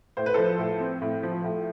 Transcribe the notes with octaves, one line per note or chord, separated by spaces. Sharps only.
A2 C5
B4
F3 A4 C5
A2
C4
A2
F3
A2